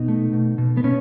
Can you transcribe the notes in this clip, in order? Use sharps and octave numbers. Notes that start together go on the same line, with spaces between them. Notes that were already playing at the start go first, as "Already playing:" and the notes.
Already playing: B2 B3 D#4
A3
B2
B2
B3
B2 C#4